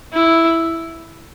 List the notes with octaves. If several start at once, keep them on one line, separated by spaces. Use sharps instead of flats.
E4